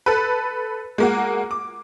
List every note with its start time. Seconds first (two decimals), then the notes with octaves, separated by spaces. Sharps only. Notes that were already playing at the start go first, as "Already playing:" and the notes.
0.06 A4 B4
0.98 G#3 A#3 F#4
1.51 D6